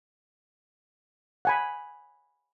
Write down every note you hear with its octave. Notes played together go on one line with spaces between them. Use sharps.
F#5 G#5 B5